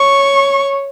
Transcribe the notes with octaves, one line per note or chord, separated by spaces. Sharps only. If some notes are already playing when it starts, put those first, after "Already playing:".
Already playing: C#5 C#6